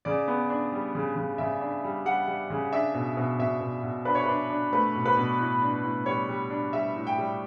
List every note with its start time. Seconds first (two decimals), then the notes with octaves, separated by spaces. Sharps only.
0.05 C#3 D5
0.28 B3
0.50 D4
0.72 G3
0.95 C#3
1.16 C#3
1.38 C#3 E5
1.61 D4
1.84 G3
2.05 G3 F#5
2.27 G3
2.50 C#3
2.72 D4 E5
2.94 B2
3.17 B2
3.39 B2 E5
3.61 B2
3.83 B2
4.05 D4 B4
4.15 C#5
4.24 B4
4.29 D4
4.50 D4
4.72 A3 B4
4.95 B2
5.05 B4
5.17 B2
5.39 A2
5.62 D4
5.84 A2
6.06 G3 C#5
6.29 G3
6.50 D4
6.73 G3 E5
6.95 A2
7.07 G5
7.18 G3